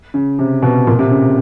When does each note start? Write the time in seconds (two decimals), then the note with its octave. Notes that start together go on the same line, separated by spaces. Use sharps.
0.14 C#3
0.39 C3
0.62 B2
0.87 A#2
0.99 C3
1.11 C#3